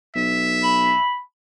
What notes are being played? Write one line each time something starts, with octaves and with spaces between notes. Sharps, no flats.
B1 E5
B5